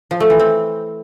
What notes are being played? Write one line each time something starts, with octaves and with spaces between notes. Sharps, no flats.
F3
A3
E3
C4